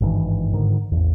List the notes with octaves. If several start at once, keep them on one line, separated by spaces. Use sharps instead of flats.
G#1 G2 D#3 E3
G#2 D3 D#3
A1 E2